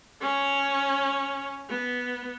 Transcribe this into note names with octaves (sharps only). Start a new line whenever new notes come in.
C#4 C#5
B3